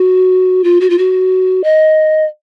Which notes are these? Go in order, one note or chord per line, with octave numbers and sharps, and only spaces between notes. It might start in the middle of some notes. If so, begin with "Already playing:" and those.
Already playing: F#4
F4
F#4
F4
F#4
D#5